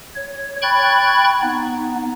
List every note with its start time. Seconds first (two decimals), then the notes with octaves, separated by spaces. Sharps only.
0.16 C#5
0.62 G5 B5 C#6 F#6 G#6 A6
1.42 B3 D#4